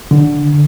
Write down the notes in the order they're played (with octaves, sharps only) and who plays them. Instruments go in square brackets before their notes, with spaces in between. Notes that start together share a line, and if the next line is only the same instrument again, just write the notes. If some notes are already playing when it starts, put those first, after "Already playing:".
[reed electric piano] D3